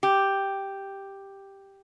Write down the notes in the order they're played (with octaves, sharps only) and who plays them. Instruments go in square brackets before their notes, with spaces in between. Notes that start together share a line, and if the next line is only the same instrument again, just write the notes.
[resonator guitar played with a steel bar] G4